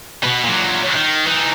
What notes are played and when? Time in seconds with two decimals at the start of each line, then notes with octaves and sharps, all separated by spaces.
0.24 B2 B3
0.44 A#2 F#3
0.95 D#3
1.26 E3 D#4